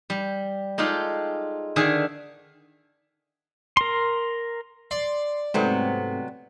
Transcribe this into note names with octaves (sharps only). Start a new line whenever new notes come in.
G3
G#3 D#4 F4 G4 A4
D3 D#3 G#4 E5 G#5
A#4 C6
D5 C6
G#2 C3 F#3 A3 B3 C4